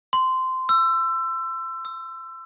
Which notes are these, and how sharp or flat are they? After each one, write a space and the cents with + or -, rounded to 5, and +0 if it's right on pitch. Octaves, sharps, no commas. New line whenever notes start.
C6 -15
E6 +25
E6 -20